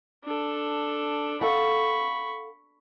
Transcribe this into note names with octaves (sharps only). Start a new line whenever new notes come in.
D4 A4
A4 F5 F#5 B5 C#6